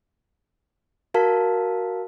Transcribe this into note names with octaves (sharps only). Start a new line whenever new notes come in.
F#4 A#4 F5 A5